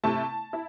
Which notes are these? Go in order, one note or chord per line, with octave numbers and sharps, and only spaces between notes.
C3 A3 E4 A5
E4